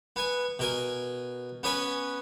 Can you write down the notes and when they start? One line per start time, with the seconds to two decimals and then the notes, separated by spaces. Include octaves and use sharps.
0.16 B3 G#5
0.59 B2 A#4 G#5
1.63 B3 C#4 B4 G#5